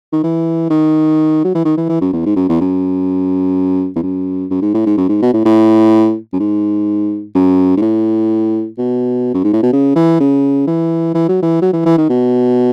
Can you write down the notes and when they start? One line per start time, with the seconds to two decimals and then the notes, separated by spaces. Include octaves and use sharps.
0.13 D#3
0.23 E3
0.70 D#3
1.44 F#3
1.55 E3
1.65 D#3
1.77 E3
1.89 E3
2.01 F#2
2.13 E2
2.25 G#2
2.36 F#2
2.49 E2
2.61 F#2
3.96 E2
4.03 F#2
4.50 F#2
4.62 G#2
4.74 A2
4.86 G#2
4.97 F#2
5.09 G#2
5.22 B2
5.33 A2
5.45 A2
6.33 F#2
6.40 G#2
7.35 F#2
7.77 G#2
7.82 A2
8.78 B2
9.34 F#2
9.44 G#2
9.53 A2
9.63 B2
9.73 C#3
9.96 E3
10.20 C#3
10.67 E3
11.14 E3
11.29 F#3
11.42 E3
11.62 F#3
11.73 E3
11.85 E3
11.98 D#3
12.09 B2